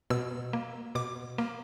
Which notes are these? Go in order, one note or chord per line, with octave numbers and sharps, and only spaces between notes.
B2 E6
A#3
B2 D6
A#3